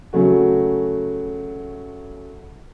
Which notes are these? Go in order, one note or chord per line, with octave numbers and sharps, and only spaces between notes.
C#3 F#3 A3 F#4